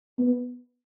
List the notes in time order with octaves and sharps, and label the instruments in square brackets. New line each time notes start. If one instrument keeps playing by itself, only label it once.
[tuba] B3